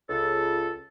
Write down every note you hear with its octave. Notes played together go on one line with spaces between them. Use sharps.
C#2 A4